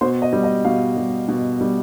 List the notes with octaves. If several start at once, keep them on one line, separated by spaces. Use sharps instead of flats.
B2 C5
D#5
G3
D#5
B2 F5
G3
B2
G3